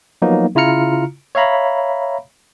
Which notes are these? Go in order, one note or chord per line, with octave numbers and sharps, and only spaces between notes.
F3 F#3 A#3 B3 D#4
C#3 E4 F4 A#5 F6 C#7
C#5 E5 F5 A#5 B5